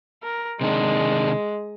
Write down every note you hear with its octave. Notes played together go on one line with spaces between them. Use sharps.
A#4
C3 D#3 G#3 D4